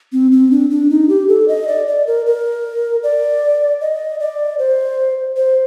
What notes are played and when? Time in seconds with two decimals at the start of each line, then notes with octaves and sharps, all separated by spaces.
0.13 C4
0.32 C4
0.51 D4
0.70 D4
0.90 D#4
1.09 G4
1.28 A4
1.48 D#5
1.68 D5
1.88 D5
2.07 A#4
2.26 A#4
3.03 D5
3.81 D#5
4.20 D5
4.59 C5
5.37 C5